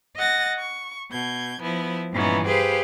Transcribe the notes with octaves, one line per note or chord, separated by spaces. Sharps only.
D#5 F#5 A6 A#6
C#6
B2 G6 G#6
F3 B3 E4
G2 A#2 E3 B3 C#4 D#4
G4 G#4 B4 C5 F5